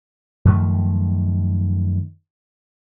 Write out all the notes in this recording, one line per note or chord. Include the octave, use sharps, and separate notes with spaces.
F#2 D#3 F3 A3